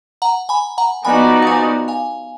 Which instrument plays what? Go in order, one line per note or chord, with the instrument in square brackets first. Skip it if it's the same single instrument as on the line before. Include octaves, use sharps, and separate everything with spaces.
[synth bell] F#5 A#5
G#5 B5
F#5 A#5
[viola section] F3 B3 D#4 F#4 D5 [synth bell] G#5 B5
[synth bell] F#5
F5 G#5
F5 G#5